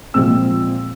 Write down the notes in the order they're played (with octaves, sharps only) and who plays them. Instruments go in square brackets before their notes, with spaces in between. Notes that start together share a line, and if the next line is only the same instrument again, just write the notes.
[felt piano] A#2 F3 G#3 C4 E6